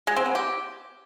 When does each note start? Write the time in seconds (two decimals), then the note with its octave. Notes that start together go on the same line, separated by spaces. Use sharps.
0.07 G#3
0.16 C4
0.26 B3
0.35 G4